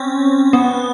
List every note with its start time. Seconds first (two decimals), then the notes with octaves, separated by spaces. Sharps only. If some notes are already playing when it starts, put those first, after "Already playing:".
Already playing: C4 C#4
0.53 B3